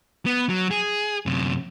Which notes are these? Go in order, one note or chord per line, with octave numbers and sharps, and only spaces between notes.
B3
F#3
G#4
F#2 C3